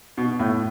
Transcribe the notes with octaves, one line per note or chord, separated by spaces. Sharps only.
B2
A2